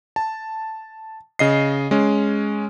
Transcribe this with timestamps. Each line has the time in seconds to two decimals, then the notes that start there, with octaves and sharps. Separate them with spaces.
0.16 A5
1.39 C#3 D#5 C7
1.91 G#3 C#4